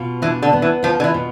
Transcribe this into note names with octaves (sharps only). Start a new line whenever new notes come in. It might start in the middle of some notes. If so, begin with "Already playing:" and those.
Already playing: B2 F4
E3 D4
D3
B3
E3
F3 F4
D3
E3
B2